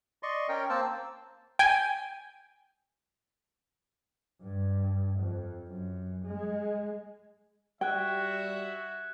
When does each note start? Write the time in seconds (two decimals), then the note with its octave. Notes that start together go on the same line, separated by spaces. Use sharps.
0.23 D5 D#5 C6 C#6
0.49 C#4 A#4 G5
0.69 A#3 C4 C5 A5 E6
1.59 G5 G#5
4.42 G2
5.20 F2
5.68 F#2
6.25 G#3
7.81 G3 F#4 E5 G5 F#6 G#6